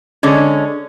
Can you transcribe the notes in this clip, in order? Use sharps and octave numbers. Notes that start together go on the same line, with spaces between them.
D3 G#3 C#4